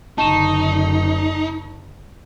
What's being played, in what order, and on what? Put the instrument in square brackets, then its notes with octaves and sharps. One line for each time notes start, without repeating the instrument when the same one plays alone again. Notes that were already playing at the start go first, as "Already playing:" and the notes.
[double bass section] F#1 D3 [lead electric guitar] D#4 [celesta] A5 C#6 E7